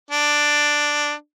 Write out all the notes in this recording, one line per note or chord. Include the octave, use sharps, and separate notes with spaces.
D4